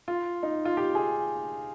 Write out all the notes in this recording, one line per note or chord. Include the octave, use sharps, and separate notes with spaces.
F4
D#4
F4
G4
G#4